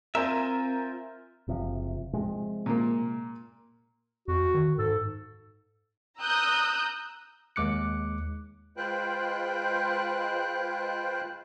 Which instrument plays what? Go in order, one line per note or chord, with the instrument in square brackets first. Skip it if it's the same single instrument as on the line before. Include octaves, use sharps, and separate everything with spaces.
[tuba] C4 [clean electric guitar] F4 C5 E5 [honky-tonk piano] A#4 G#5
[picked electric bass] F#1 C3 F3
C3 F3 G#3
[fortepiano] A#2 A#3
[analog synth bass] F2 [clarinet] F#4
[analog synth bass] D#3
[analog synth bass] G#2 [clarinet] A4
[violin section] A#5 D#6 E6 F#6 G6
[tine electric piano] D#2 G#3 D6 F#6 C#7
[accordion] G#3 F4 B4 C5 G5 F#6